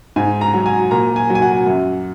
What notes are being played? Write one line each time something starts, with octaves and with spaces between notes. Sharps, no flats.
G#2 G#5
A#5
F#3
G#5
A#2 A#5
G#5
F#3
G#5
F#5
F#2